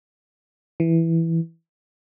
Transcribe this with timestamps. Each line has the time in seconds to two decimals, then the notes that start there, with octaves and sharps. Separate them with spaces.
0.80 E3